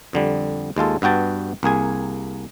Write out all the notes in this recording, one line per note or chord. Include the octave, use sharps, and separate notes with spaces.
F2 D3 G3
D#2 G#3 F4 A4
G2 B3 F#4 G5 A5
C2 A#3 G#4 G#5